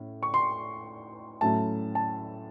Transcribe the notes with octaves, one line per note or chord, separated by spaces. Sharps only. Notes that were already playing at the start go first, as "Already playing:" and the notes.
Already playing: A2 C#4
C#6
C6
A2 F#3 A3 C#4 A5
A5